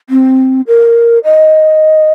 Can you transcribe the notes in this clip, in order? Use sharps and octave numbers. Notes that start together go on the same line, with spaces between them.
C4
A#4
D#5